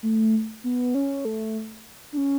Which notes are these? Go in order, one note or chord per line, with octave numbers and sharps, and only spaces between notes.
A3
B3
C#4
A3
D4
C#4